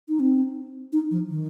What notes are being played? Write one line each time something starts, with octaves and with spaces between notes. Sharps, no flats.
D#4
C4
D#4
F3
D#3